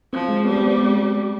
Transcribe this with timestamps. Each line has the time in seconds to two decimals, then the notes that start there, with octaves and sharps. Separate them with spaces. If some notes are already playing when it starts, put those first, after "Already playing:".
0.13 F3 C4
0.29 G#3
0.45 G3 B3
0.56 C4
0.68 B3
0.78 G#3